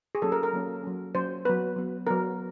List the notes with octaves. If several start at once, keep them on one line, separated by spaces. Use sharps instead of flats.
G#4
F#3 A#3 C#4 A4
A#4
A#4
F#3 A#3 C#4
F#3 A#3 C#4
F#3 A#3 C#4 C5
F#3 B3 B4
F#3 B3
F#3 B3 A#4